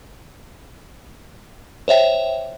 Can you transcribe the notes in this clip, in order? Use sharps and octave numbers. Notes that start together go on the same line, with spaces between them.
C5 C#5 E5 G5